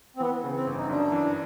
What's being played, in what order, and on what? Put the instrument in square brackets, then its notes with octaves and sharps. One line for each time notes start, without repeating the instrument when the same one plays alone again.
[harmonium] C4
[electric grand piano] E3 [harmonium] B3
[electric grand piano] C#3
[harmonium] C4
[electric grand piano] G1
[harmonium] D#4
[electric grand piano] F#2 [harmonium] D4
[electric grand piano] E3